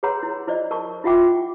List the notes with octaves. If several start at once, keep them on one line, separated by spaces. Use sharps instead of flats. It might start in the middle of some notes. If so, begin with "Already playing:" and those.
G#4 B4 C#5 F#5 A#5 C6
E4
E4 C5 D5 D#5
A#4 A5 C#6
E4 F4 E5 F#5 G5 D6